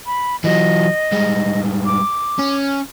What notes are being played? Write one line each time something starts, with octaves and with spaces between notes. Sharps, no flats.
B5
E3 F#3 D#5
G2 G#3
D6
C#4